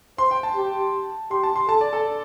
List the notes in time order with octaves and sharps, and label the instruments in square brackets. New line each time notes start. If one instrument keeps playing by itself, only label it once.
[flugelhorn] C5 [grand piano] C6
[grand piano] G5
A5
[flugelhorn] G4
[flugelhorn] G4 [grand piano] C6
[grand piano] A5
C6
[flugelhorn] A4 [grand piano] A5
[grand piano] D5
A4